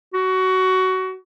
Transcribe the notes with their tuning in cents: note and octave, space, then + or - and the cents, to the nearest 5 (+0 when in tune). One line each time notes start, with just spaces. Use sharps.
F#4 +20